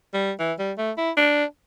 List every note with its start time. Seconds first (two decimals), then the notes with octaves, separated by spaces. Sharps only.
0.14 G3
0.39 E3
0.59 G3
0.78 A3
0.97 E4
1.17 D4